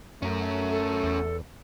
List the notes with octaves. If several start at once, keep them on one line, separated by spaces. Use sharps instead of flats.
F#2 A3 C#4 A#4
A4
E2